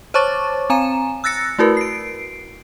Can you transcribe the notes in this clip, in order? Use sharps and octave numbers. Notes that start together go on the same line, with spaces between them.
C5 C#5 A5 C#6 D6 A6
C4 G#5 A#5 E7
E6 F#6 A6 A#6 C#7
A3 E4 F#4 A#4 B4
C7 D7